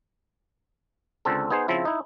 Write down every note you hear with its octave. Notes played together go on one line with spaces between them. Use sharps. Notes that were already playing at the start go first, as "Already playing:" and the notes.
C#2 D3 C4 A4
B3 D#4 G#4 C5
C#3 F3 C4 E4
D#4 E4